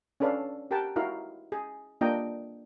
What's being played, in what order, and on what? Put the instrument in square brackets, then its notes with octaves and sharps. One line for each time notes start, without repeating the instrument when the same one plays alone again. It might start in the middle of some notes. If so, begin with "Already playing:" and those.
[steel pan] C#4 D4 A4 B4 D5 F5
G4 A#4 F#5 G5 A5
D#4 E4 F#4 A#4 F5
G#4
A#3 D4 F4 D#5 G5 A#5